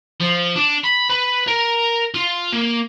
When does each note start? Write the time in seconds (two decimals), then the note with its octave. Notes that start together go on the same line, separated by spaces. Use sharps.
0.21 F3
0.56 D4
0.84 B5
1.10 B4
1.48 A#4
2.14 F4
2.53 A#3